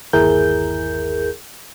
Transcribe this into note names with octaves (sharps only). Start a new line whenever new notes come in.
G1 D#2 E4 G#4 A#4 G6